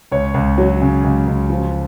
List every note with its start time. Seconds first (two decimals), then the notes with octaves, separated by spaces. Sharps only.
0.12 C#2 C#5
0.34 C#2
0.58 F#3
0.82 C#3
1.04 C#2
1.27 C#2
1.50 F3